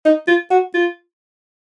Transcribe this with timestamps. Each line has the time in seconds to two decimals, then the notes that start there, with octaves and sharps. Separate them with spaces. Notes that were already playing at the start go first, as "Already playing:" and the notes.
0.05 D#4
0.27 F4
0.50 F#4
0.74 F4